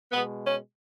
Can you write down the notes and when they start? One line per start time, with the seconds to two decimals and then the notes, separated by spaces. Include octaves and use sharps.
0.12 B2 G#3 B3
0.46 C#4